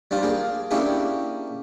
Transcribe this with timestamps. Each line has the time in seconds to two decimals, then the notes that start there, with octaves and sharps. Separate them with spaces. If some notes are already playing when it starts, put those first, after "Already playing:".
0.11 G3 D4 F4 C5
0.23 A#3 G#4
0.71 A#3 C#4 D4 E4 G4 G#4